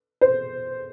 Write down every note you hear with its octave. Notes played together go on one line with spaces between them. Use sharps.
C5